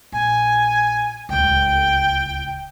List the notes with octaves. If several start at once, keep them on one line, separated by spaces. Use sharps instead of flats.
A#1 G#5
D1 C#2 G5